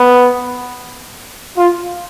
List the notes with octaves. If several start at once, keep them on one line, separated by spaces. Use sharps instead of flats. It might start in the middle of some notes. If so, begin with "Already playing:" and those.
Already playing: B3
F4